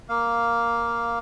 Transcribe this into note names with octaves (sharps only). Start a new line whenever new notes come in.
A#3 F5